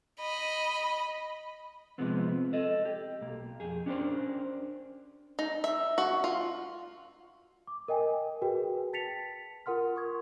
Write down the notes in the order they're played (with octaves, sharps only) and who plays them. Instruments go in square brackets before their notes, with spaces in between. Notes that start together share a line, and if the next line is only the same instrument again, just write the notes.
[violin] D#5 B5
[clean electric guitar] C3 E3 F3 G#3 B3 C4
A4 D#5
G4
B1 A#3
F2 G4 G#4
C#4 D4 G4 A4 A#4 C5
[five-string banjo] D#4
E5
F#4
F4
[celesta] D6
A#4 D#5 G5 G#5
F#4 G#4 B4 G5
A5 A6 B6 C#7 F7
F4 A#4 F#5 C6 F6
C#6 D#6 G#6